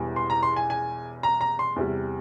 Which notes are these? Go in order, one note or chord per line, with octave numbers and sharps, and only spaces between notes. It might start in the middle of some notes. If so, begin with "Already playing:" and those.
Already playing: E1 E2 E3 G3
C6
A#5
C6
G#5
G#5
A#5
A#5
C6
E2 C3 G3